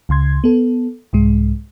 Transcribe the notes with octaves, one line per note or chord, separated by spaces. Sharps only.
C#2 C#3 C6 G#6
B3 A4
C2 G#2 G#3